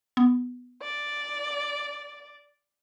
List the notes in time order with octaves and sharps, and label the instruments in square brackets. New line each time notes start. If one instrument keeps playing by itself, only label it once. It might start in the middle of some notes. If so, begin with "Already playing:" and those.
[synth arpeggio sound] B3
[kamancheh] D5